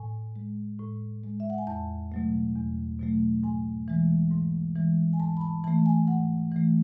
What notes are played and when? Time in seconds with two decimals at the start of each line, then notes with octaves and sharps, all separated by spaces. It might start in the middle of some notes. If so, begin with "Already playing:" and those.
Already playing: A2 G#5
0.36 G#3
0.79 A2
1.24 G#3
1.40 E5
1.50 F#5
1.58 G#5
1.67 E2 A5
2.12 B2 F#3 A3
2.55 E2
2.99 B2 F#3 A3
3.44 G#2 G#5
3.88 E3 G#3
4.31 G#2
4.76 E3 G#3
5.13 G#5
5.20 G#2 A5
5.37 B5
5.41 A5
5.64 E3 A3 A5
5.86 G#5
6.07 G#2 F#5
6.52 E3 A3